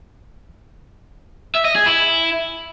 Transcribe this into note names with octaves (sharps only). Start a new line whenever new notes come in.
E5
D#5
G#4
E4